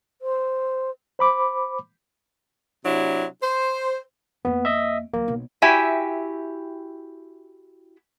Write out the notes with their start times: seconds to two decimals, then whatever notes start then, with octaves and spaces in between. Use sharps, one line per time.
0.22 C5
1.19 C5 B5 D6
2.85 C3 F#3 D4 E4
3.42 C5
4.45 F2 A#3 B3
4.65 D#5 E5
5.13 D2 F#3 A#3
5.28 B1
5.62 E4 F#4 G4 E5 G5 G#5